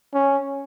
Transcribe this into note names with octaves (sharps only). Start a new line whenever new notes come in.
C#4